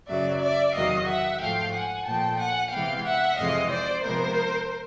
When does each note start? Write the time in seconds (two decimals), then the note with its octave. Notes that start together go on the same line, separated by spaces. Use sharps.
0.08 F#2 C#3 F#3 D5 E5
0.41 D5 E5
0.74 E2 C3 D#3 F#3 D#5 F5
1.07 E5 F#5
1.40 G#2 F3 A3 F5 G5
1.73 F#5 G#5
2.05 A#2 F3 A3 G5 A5
2.39 F#5 G#5
2.71 C3 E3 G#3 B3 F5 G5
3.05 E5 F#5
3.37 F2 C3 E3 G#3 D#5 F5
3.70 C5 D5
4.03 C3 F3 G#3 B3 A#4 C5